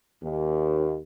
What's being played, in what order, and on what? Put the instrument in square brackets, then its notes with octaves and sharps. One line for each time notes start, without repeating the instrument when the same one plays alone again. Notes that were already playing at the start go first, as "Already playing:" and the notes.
[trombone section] D#2